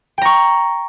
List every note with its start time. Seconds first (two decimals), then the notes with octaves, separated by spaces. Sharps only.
0.18 G5
0.22 A#5
0.25 C#6